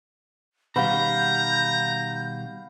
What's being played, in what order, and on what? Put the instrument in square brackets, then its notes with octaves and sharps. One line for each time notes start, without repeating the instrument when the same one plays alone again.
[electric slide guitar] B2 D#3 G3 [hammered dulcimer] F5 F#5 B5 [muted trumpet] A#5 [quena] G6